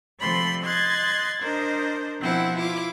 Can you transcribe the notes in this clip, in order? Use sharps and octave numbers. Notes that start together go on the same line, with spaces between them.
C3 F3 A3 D5 B5 C6
D#5 C6 F#6 G#6 A6
D4 A#4 C5 D#5
B2 F3 C4 E4 F#5
E4 F4 D6